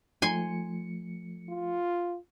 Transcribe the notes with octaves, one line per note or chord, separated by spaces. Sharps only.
F3 A3 G#5 C6 C#7
F4